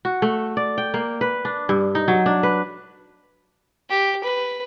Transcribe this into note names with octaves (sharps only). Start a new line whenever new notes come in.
F#4
A3
D5
G5
A#3
B4
D4
G2
D#4
F#3
D4
B4
G4
B4